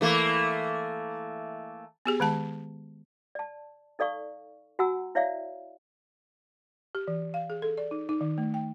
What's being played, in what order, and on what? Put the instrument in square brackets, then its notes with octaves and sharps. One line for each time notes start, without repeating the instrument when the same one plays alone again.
[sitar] E3 A3 A#3
[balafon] B3 G4 G#4
D#3 G#3 A5
[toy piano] D5 A5
D#4 A4 D5 F5 C#6
F#4 F#5 G#5 A#5 E6
E4 C#5 D5 E5 F5
[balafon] G4
E3
F5
G#4
A4
D5
D#4
D#4
D#3
A3
G5